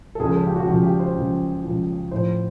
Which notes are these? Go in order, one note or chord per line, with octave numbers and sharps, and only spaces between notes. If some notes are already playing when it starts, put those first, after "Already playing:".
A4
C#2 C#3 F3 G#4
A4
G4
F#4
C#2 C#3 F3 F#4
G4
C5
C#2 C#3 F3
C#2 C#3 F3
A2 F3 C5